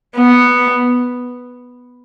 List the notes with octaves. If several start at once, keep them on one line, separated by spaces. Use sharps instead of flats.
B3